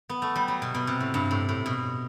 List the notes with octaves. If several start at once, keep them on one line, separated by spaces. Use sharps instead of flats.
B3
A3
G3
F#3
B2
B2
C3
A2
G2
A2
A2
B2